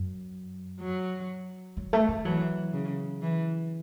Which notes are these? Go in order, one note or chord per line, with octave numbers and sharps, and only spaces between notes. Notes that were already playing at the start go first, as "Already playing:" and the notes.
Already playing: F#2
F#3
F#3
A3
A3
E3 F#3
C#3
E3